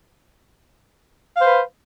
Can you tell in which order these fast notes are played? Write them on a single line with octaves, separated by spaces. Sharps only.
F5 C5 B4